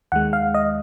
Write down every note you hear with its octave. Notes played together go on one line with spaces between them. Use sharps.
D#2 D#3 G#3 F#5
F5
D#5